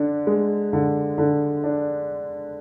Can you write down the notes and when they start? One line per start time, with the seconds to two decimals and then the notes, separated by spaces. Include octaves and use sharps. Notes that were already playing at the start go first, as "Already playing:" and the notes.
Already playing: D3 D4
0.27 G#3
0.73 D3
1.18 D3
1.64 D4